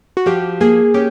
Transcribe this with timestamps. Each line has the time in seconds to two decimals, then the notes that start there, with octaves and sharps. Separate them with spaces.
0.17 F#4
0.26 F3 G4
0.61 A#3 G#4
0.94 C#4 G4